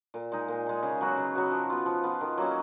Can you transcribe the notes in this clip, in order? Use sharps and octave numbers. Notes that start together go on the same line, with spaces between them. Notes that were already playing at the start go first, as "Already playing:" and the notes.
A#2
G#3 D#4
A#2
G#3 D#4
C#3
F#3 B3 F#4
C#3
F#3 B3 F#4
F3
B3 F4
F3
B3 F4
D#3
F#3 A#3 C#4